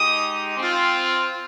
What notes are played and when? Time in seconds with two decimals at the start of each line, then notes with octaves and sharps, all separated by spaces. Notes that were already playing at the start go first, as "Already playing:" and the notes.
Already playing: G#3 D#4 G4 D#6
0.58 C4 F4